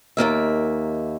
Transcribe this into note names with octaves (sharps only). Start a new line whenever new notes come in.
D#2 D#3 A#3 E5